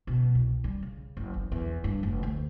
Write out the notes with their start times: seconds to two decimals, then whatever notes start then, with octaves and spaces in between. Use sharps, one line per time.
0.07 B2
0.35 C2
0.64 G3
0.83 C#3
1.17 F#1
1.34 E2
1.52 E2
1.84 G2
2.03 F1
2.23 D2